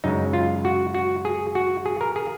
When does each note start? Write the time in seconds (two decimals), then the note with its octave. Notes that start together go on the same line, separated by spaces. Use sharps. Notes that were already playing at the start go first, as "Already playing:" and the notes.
0.04 F#2 C#3 G#3 D#4
0.33 F4
0.65 F#4
0.94 F#4
1.25 G#4
1.55 F#4
1.86 G#4
2.01 A#4
2.16 G#4